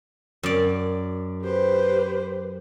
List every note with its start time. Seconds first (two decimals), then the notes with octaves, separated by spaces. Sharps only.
0.43 F#2 D5
1.42 G4 B4 C5